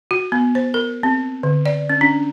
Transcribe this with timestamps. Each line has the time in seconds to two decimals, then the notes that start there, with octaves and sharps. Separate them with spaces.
0.11 F#4
0.32 B3
0.55 C5
0.74 A#4
1.03 C4
1.43 D3
1.66 D5
1.90 C#4
2.01 D4